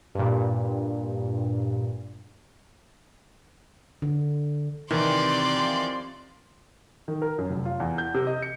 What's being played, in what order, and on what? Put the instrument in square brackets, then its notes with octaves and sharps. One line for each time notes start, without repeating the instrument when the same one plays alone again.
[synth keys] G2 A#2
[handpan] D3
[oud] C3 [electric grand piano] D#3 E3 [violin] D5 C6
[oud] F3
[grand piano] D#3
A#4
F#2
F1
F4
E2
G6
C3
D#5
C#7